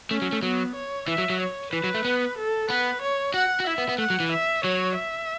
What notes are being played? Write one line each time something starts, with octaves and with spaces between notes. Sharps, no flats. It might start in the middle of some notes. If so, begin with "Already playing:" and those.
A3 C#4
F#3
A3
F#3 B3
C#5
E3 E5
F#3
F#3
C#5
E3 B4
F#3
A3
B3
A4
B3 B4
C#5
F#4 F#5
F#4
E4 E5
B3
B3
A3 F#5
F#3
E3
E5
F#3 C#5
E5